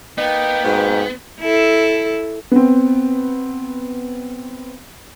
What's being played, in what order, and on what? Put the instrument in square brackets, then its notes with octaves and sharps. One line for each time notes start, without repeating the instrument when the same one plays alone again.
[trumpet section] A#3 G5 [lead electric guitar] B3 [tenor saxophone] D#4
[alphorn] G#2 [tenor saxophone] B2
[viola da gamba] E4 A4
[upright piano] B3 C4